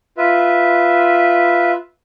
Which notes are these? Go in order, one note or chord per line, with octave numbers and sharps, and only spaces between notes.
F4 B4 E5